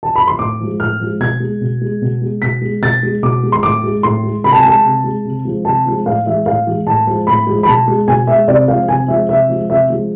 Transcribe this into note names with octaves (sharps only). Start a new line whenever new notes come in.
A5
B5
C6
A2 D6
F3 G#3
A2 F6
F3 G#3
B2 G#6
G#3
B2
G#3
B2
G#3
B2 B6
G#3
B2 A6
G#3
B2 D6
G#3
C6
A2 D6
G#3
A2 C6
G#3
C3 B5
A5
G#5
G#3 A5
C3
G#3
C3
F3 G#3
C3 A5
F3 G#3
A2 F5
E3 G#3 E5
A2 F5
E3 G#3
A2 A5
F3 G#3
A2 B5
F3 G#3
B5
B2 A5
G#3
B2 G#5
G#3 E5
C3 D5
F3 G#3 F5
C3 G#5
F3 G#3 E5
C3 E5
F3 G#3
C3 E5
F3 G#3